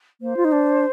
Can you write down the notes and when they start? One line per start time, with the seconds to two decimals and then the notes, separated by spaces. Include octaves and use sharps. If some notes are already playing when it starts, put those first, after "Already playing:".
0.21 A#3 C5
0.37 F4
0.45 D#4
0.52 D4